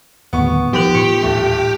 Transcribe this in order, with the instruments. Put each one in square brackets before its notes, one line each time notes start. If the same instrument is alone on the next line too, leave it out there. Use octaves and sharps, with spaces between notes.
[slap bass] D1 D#2 A2 [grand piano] B3 C#6
[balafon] E3 D#4 A#4 [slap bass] F3 [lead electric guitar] G4
[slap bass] A2 [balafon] F4
[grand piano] D#1 A3